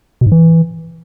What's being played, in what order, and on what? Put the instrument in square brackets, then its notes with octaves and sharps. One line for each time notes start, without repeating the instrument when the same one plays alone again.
[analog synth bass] B2
G#2
E3